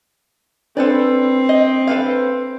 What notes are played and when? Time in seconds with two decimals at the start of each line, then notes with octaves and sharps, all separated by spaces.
0.77 C4 D4 A4 B4 D5
1.49 D#5
1.87 A4 B4 F5